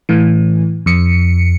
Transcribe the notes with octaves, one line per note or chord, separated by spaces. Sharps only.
A2 E3
F2 C#7